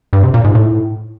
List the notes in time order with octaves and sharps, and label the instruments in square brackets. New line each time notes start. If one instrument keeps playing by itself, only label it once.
[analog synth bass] G2
C3
A#2
G#2
A2